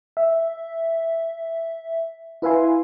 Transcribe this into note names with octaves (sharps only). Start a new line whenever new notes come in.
E5
E4 B4 E5 F5 G#5 C6